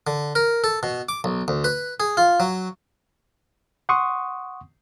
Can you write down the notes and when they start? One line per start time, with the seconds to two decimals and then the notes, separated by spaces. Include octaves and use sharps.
0.07 D3
0.35 A#4
0.64 A4
0.83 B2
1.09 D6
1.24 B1
1.48 D2
1.64 B4
2.00 G#4
2.17 F4
2.40 F#3
3.89 F#5 C6 C#6 D#6